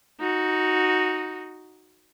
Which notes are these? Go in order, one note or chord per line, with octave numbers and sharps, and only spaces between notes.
D#4 F#4